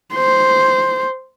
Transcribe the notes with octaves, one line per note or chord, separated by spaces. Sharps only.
C5